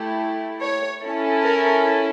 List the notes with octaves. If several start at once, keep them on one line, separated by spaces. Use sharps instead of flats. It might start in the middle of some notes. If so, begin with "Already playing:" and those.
Already playing: A3 E4 G4
C#5
C#4 E4 A4
A#4